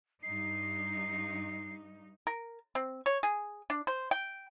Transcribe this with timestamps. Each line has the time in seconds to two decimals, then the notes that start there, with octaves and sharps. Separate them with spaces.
0.23 G2 D#4 C7
2.27 A#4
2.75 C4
3.06 C#5
3.23 G#4
3.70 D4
3.87 C5
4.11 G5